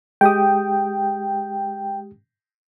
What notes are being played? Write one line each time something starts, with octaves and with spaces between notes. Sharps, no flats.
G#3 G4 G5 D#6